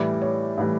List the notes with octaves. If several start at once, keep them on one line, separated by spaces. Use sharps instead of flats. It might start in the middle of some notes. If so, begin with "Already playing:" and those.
Already playing: A2 E3 G3 D5
C#5
A2 E3 G3